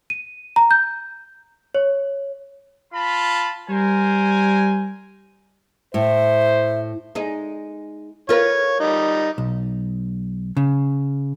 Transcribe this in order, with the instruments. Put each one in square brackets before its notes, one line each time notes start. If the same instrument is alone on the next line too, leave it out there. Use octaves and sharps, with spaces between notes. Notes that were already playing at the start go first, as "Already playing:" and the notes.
[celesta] D#7
A#5
G6
C#5
[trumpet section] F4 A5 B5
[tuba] G3 [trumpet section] A#4 C5 G#5
[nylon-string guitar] A2 [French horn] C5 [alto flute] E5
[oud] G#3 D#4
[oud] F4 A#4 B4 [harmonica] C#5
[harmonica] G3 D#4
[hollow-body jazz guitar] B1
C#3